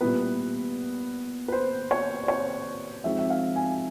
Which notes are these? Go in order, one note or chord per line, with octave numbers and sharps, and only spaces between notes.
A#2 G3 B3 E4 B4
B4
C5
C#5
D5
C#5
F3 G#3 C4 D#4 E5
E5
F5
G#5